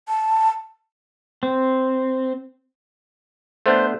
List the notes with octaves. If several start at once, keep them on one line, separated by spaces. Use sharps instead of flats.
A5
C4
A3 B3 D4 C5